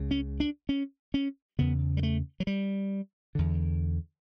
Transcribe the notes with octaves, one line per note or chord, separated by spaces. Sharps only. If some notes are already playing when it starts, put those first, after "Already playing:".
Already playing: C#2 C#3
C#4
D4
C#4
C#4
E2 C#3 B3
G3
A3
F#3
G3
E2 D3